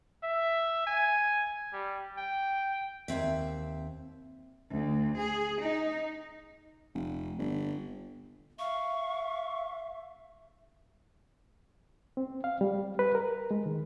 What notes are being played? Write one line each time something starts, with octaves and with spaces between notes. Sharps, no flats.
E5
G#5
G3
G5
D#2 G#2 C4 E5
D2
G#4
D#4
F1
G1
E5 F5 C#6
C4
F5
G3
B4
A#4
G#3
D#3